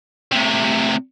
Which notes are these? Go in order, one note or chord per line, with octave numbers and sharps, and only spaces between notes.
A2 C3